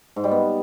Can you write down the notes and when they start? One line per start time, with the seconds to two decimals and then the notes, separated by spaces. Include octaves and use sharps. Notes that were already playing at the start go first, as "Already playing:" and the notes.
0.16 G#2
0.24 G3
0.31 B3